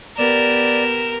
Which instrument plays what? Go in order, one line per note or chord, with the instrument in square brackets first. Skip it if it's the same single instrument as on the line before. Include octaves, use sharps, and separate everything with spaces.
[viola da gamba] B3 G4 [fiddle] A#4 [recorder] D5 [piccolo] E7